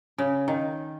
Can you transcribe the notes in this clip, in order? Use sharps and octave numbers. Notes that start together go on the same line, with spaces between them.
C#3
D#3